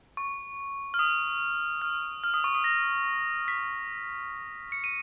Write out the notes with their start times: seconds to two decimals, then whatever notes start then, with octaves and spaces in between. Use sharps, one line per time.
0.17 C#6
0.94 F6
0.99 D#6
1.82 F6
2.24 F6
2.34 D#6
2.44 C#6
2.55 D#6
2.64 A#6
3.48 B6
4.72 C#7
4.84 D#7